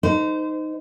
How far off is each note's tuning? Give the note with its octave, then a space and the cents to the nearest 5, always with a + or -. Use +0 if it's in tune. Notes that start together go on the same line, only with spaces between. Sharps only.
D#4 +0 C5 -30